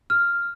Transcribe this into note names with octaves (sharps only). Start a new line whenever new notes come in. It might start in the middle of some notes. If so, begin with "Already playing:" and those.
F6